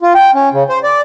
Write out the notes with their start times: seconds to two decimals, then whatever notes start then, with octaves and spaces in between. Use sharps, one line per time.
0.01 F4
0.15 G5
0.34 C#4
0.53 C#3
0.69 C5
0.83 D5